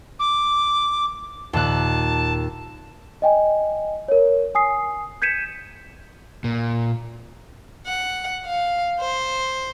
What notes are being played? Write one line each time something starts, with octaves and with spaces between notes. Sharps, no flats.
D6
D#2 A#2 A5 F#6
D#5 G5 G#5
A#4 C#5
G#5 D#6 C7
G6 G#6 B6 C#7 D#7 E7
A#2
F#5
F5
C5